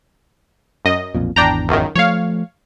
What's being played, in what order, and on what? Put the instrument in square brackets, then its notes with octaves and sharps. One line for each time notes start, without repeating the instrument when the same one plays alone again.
[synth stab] F#2 D#5
[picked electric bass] B1 F2 A#2
[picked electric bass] G#1 E2 [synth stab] D4 G5 A#5
[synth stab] C#2 F#2 D#3
[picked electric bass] F3 F#3 A3 [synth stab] C#5 F5